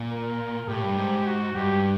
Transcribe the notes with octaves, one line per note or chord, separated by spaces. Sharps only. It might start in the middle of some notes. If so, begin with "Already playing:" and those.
Already playing: A#2
A#4
A2 G4
G2
G#2
F#4
G2 G4